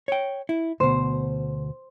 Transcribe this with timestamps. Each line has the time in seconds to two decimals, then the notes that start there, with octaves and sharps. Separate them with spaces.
0.08 C#5 G5
0.49 E4
0.80 D2 B2 C5